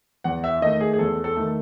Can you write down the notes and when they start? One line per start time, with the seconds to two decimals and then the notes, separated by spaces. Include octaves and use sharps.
0.24 E2 F#5
0.44 E5
0.61 D#3 A3 D#5
0.80 G#4
0.93 G#4
0.99 E2 A4
1.24 A4
1.37 D#3 A3